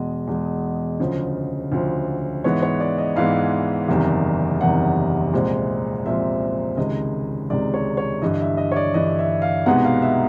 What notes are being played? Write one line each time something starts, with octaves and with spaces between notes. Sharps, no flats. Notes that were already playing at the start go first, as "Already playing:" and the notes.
Already playing: E2 B2 G#3 D#5
E2 B2 G#3
D2 C#3 F3
D2 C#3 F3
G#2 E3 G#3 B3 C#5
C#5
D5
D#5
G#2 E3 G#3 B3 F5
F#1 E2 C3 D#3 G3
F#1 E2 C3 D#3 G3 F#5
C2 A#2 F3 G#3 C4
C2 A#2 F3 G#3 C4 E5
C#2 C3 D#3 G#3 D#5
C#2 C3 D#3 G#3 D5
C#5
C#5
G1 G2 E3 D#5
E5
D#5
C#5
D5
G1 G2 E3 D#5
E5
F5
C2 B2 G#3 B3 D#4 F#5
F5
E5